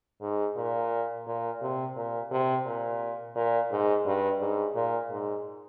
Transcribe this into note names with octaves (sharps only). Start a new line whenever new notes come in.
G#2
A#2
A#2
C3
A#2
C3
A#2
A#2
G#2
G2
G#2
A#2
G#2